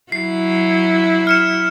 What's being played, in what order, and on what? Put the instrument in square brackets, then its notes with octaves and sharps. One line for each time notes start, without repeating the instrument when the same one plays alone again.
[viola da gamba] F#3 E4 [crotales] C7
[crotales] F6 C#7 E7